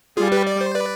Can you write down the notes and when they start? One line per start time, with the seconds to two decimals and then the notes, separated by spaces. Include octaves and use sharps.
0.17 G3 F4 G#4
0.32 G4 B4
0.47 D5
0.61 C5
0.75 B4 D5